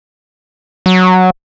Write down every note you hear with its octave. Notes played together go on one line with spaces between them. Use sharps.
F#3